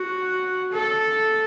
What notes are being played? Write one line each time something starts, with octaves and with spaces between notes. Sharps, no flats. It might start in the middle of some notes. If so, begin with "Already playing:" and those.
Already playing: F#4
A4